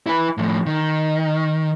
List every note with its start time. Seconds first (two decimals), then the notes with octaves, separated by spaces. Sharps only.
0.06 E4 B4
0.38 A2 F3
0.66 D#3